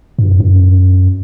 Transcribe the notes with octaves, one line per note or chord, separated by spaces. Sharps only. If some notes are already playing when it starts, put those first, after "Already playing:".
G2
F#2
F#2